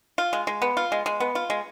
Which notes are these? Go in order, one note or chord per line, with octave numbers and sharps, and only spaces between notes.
F4
G#3
G#3
B3
F4
G#3
G#3
B3
F4
G#3